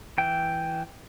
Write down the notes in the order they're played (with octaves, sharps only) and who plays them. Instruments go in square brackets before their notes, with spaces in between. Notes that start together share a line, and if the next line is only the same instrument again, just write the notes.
[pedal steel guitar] E3 G5